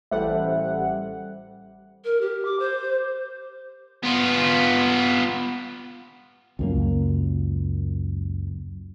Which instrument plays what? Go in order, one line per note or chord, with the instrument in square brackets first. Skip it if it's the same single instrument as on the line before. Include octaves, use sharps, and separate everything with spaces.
[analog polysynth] A1 G3 F#5 [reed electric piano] A4 C5 E5
[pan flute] A#4
G4
D6
C5
[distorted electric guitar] B3 F4
[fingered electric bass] C#2 F#2 A#3